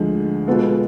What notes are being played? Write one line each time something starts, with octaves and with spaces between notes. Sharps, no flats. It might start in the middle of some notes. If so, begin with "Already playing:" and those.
Already playing: D2 D3 F3 G#3
B2 G#3 B3 F4 A4